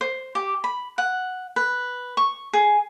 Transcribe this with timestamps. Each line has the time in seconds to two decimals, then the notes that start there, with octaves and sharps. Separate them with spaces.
0.01 C5
0.35 G4
0.64 B5
0.98 F#5
1.56 B4
2.17 C#6
2.53 G#4